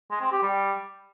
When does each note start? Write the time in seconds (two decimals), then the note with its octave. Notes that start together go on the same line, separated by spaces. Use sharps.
0.11 G#3
0.21 C4
0.32 G4
0.43 G3